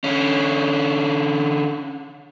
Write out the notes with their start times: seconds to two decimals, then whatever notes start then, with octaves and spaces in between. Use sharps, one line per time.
0.04 D3 C#4